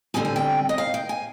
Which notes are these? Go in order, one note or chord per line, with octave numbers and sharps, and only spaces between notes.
D3 G3 C4 D#4 G#5
G#5
G5
D#5
F5
G5
G#5